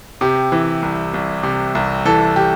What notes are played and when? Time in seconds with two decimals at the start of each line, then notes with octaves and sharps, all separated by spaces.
0.21 C3 G4
0.52 E3
0.82 C2
1.14 C2
1.43 C3
1.75 C2
2.05 E3 A4
2.36 G4